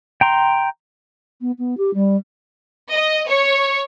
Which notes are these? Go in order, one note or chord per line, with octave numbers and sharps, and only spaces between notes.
G5 A#5 C6
B3
B3
G4
G3
D#5
C#5